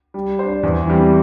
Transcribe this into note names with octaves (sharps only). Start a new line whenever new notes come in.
G3
D4 C5
E2
E3 G3 C4